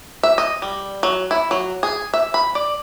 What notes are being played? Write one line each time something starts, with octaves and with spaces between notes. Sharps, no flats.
E5
D#5
G3
F#3
E4
F#3
G#4
E5
B5
D5